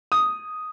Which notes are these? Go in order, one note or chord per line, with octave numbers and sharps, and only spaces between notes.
D#6